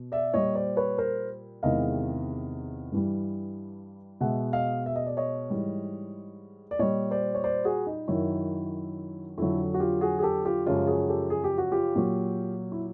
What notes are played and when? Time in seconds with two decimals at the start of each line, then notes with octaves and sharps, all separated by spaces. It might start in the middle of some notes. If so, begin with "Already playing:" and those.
Already playing: B2
0.12 D5 E5
0.34 A#2 G3 C#5 D#5
0.55 C5 D5
0.77 B4 C#5
0.98 A#4 C5
1.63 E2 C3 D#3 G#3 D#5 F5
2.92 G2 E3 G3
4.21 B2 G#3 E5 F#5
4.53 D#5 F5
4.86 E5
4.96 D#5
5.06 D5
5.17 C#5 D#5
5.50 G#2 E3 G3
6.71 D5
6.79 A#2 G3 C#5 D#5
7.11 C5 D5
7.35 C#5
7.44 C5 D5
7.65 F#4 G#4
7.86 D#4
8.08 F#2 D#3 F#3 E4
9.38 F2 D3 F#3 E4
9.74 F#4
9.80 F4 G4
10.01 F#4 G#4
10.19 G#4
10.23 G4 A4
10.45 F4 G4
10.66 F#2 C#3 F3 G#3 F4 G4
10.87 F#4 G#4
11.09 G4 A4
11.30 G#4
11.44 G4
11.58 F#4
11.71 F4 G4
11.96 A#2 F#3
12.72 E4